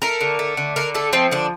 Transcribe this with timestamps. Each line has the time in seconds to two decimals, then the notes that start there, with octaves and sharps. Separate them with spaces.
0.02 A3 A#4
0.21 D3
0.39 A3
0.57 D3
0.76 D3 A#4
0.95 A3 A4
1.13 F3 C4
1.32 D3 D4